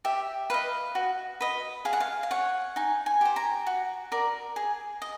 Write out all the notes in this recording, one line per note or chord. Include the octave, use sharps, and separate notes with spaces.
G4 E5
B4 D#5 F5
F#4
B4 D#5
G#4 F5
F#5
F5
F5
C#5 F#5
D#4 G#5
G#5
G4 C5
A#5
F#4
A#4 D5
G#4
D#5